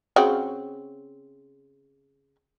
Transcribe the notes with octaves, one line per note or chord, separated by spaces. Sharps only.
C#3 C4 F#4